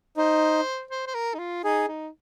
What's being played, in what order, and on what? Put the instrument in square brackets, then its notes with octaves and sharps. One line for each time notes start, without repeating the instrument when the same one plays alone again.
[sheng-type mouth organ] D#4 [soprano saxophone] C5
[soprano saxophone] C5
C5
A#4
D#4
F4
[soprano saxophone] D#4 [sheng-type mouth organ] G#4
[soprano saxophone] D#4